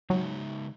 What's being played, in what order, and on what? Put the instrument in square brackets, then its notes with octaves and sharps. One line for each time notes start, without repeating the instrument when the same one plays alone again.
[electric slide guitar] C#3 G#3 D#4 [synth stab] F#3